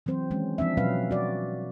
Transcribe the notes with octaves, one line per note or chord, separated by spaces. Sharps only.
E3 F#3 C4 C5
D#3 E3 G#3 C#4
F3 C4 D4 E5
B2 F#3 C#4 B4 F5
G3 F#4 D5